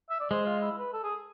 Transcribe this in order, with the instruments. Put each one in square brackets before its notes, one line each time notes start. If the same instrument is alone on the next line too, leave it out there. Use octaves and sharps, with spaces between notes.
[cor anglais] E5
D5
[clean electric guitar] G#3 [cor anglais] C5
[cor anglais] F4
E4
B4
A4
G#4